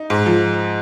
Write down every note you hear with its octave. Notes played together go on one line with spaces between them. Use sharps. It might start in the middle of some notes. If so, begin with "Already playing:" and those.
Already playing: D#4
G#2
F3